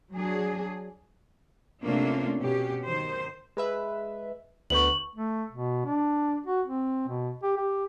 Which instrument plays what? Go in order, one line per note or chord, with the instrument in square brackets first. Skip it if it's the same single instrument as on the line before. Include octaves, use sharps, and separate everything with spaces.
[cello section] F#3 D4 G#4
C3 A3 A#3 C#4 D4 F4
B2 C#4 G4
D#3 C5
[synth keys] G#3 B4 E5
[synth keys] D2 B3 G6 [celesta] C#6 F#7
[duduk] A3
B2
D4
F#4
C4
B2
G4
G4